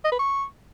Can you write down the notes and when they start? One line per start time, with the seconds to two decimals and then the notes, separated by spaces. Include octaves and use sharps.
0.05 D#5
0.12 B4
0.19 C#6